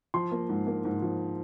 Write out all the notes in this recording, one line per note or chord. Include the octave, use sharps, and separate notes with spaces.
F3 C6
A#3
G#2
A#3
G#2
F3